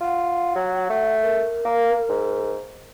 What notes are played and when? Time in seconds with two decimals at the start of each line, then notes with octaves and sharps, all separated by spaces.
0.01 F4 F#5
0.56 F#3
0.90 A3
1.22 A#4
1.65 A#3
2.09 G#2